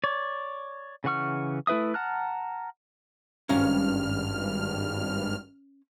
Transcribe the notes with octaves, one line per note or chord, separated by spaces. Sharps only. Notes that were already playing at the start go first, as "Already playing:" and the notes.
C#5 D5
C#3 E3 F#5 C#6 F6
A3 E4 B4 E5 D#6
F#5 A5 A#5 F6 F#6
G#1 G2 C#4 F5 A#5 F6